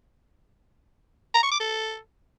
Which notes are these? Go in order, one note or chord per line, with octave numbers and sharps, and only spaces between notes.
A#5
C#6
D6
A4